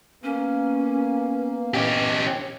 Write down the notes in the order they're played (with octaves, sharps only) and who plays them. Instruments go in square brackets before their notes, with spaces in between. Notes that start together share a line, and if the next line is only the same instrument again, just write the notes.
[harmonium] A#3 [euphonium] B3 [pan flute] C#4
[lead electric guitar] C#4 G4 [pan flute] D#5